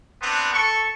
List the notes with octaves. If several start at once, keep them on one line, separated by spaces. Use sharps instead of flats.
B3 C4 D4
A4 C#6